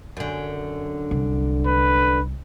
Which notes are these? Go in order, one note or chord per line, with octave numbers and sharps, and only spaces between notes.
F#2 D3
C2
B4